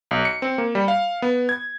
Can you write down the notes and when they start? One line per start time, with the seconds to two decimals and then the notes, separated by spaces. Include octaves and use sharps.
0.11 B1
0.25 C#7
0.42 C4
0.58 A#3
0.75 G3
0.88 F5
1.22 B3
1.49 G#6